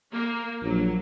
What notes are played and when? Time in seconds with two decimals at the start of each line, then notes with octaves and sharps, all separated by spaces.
0.11 A#3
0.63 A#1 F#3